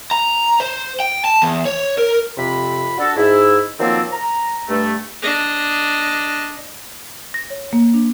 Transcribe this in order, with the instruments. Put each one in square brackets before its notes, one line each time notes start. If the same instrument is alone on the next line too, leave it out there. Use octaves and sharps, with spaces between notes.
[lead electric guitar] A#5
C5
G5
A5
E2
C#5
A#4
[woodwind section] F2 C3 B5
D4 F#4 A4
G#2 E4
D#3 F3 F#3 A#3 C4 A4
A#5
G2 A3
[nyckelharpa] D4 D#5
[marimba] A#6
C#5
A#3
D4